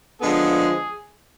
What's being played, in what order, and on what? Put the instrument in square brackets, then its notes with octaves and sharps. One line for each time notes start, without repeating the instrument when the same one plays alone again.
[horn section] D3 F3 G#3 B3 G#4